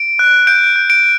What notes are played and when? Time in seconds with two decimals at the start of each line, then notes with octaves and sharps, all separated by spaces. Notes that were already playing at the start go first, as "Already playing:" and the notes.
Already playing: D7
0.19 F#6
0.47 G6 D7
0.76 G6
0.90 D7